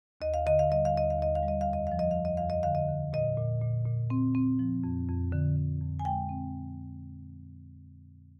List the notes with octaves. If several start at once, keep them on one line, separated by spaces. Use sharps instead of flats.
D#2 D#5
F5
D3 D#5
F5
G3 D#5
F5
D#2 D#5
F5
D#2 D#5
F5
G3
D#5
F5
F2
D#5
F3 F5
D#5
F5
F2
D#5
F2 F5
D#5
D3 F5
D#5
D3
A#2 D#5
A#2
A#2
A#2
C4
C4
F3
F2
F2
D3
D3
F2
G#5
G#3 G5
C4